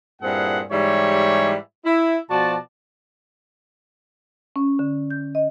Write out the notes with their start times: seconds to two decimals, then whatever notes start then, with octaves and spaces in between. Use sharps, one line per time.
0.22 G2 A#2 C4 E4 G#4 F#5
0.72 G#2 E3 G3 E4 G4 C#5
1.85 E4
2.30 B2 F3 F#4 D5 A5
4.56 C#4
4.79 D3
5.11 G6
5.35 D#5